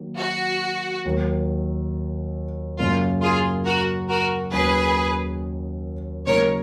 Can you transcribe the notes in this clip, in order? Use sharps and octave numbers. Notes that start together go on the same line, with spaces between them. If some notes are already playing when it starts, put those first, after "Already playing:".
Already playing: D#3 F#3 A#3
F#4
D#2 D#3 F#3
F#2 C#3 F#3 A#3 F4
F4 G#4
F#4 A#4
F#4 A#4
D#2 D#3 F#3 C#4 G#4 B4
C#3 F#3 A#3 D#4 A#4 C#5